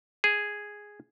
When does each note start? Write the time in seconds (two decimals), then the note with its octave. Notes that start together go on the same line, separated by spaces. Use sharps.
0.24 G#4